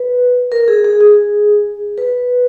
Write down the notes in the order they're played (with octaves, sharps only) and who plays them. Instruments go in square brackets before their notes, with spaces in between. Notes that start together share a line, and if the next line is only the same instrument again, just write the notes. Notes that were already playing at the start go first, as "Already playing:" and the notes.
Already playing: [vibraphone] B4
A#4
G#4
G#4
G#4
B4